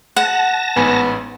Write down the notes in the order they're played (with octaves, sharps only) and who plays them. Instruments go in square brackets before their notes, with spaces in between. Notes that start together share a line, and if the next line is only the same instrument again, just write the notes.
[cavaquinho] F#5 [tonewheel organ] A5 A#6
[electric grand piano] A1 G#2 G#5 [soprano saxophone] B3